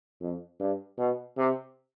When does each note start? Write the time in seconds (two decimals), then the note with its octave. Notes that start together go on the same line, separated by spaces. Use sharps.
0.21 F2
0.60 G2
0.98 B2
1.37 C3